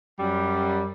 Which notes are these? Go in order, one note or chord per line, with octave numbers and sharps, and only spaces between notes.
F#2 G3